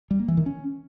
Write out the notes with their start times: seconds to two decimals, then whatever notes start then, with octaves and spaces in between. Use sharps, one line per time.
0.11 G3
0.19 A#3
0.28 E3
0.37 D#3
0.46 C#4